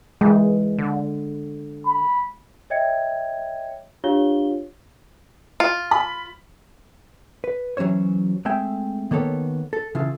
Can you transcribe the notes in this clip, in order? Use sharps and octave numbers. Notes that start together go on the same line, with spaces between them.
E3 G#3
D3
B5
C#5 D#5 E5 G5 G#6 C#7
D4 F4 G4 C#5 F5 G7
F4
B5
B4
E3 F#3 C#4 C5 C#5
G#3 A3 C4 E5 G5 G#5
D#3 A#3 B3 A4 C#5
A4
C#3 E3 F4 A4